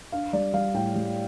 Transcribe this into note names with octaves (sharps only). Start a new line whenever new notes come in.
D4 F5
G3 D5
G3 F5
A2 G5
G3